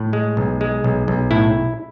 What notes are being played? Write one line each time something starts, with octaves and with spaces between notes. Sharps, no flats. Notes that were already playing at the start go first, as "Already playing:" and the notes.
Already playing: A2
G#3
B1
G#3
B1
B1
A2 E4